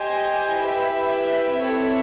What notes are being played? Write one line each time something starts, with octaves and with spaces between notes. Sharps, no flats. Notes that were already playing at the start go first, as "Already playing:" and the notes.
Already playing: G4 C5 D#5 G#5
E4 G4 B4 E5
C4 E4 A4 C#5 E5